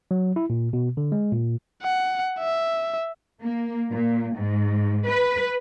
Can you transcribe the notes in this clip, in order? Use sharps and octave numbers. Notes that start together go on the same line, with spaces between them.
F#3
E4
A#2
B2
D3
G#3
A#2
F#5
E5
A#3
A#2
G#2
B4